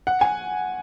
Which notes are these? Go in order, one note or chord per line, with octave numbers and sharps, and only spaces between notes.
F#5
G#5